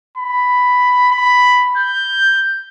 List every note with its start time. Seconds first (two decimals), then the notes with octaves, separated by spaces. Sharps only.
0.18 B5
1.11 B5
1.77 G6